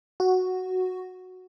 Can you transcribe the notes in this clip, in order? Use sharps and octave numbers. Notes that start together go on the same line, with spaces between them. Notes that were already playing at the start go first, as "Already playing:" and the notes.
F#4